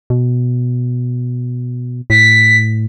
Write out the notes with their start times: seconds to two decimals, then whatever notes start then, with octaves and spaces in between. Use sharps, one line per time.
0.10 B2
2.10 A2 B6